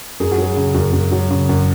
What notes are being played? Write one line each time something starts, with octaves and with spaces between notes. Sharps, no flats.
F#2 G#4
F#4
F#3 G#4
C#3
F#2
F#2
F#3
C#3
F#2